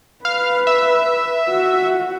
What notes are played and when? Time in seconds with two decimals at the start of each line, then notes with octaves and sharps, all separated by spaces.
0.25 B4 F5
0.67 E5
1.50 F#4